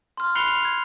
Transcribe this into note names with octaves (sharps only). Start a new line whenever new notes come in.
C6 F6
B5 F#6 C7 C#7 F7 G7
G#6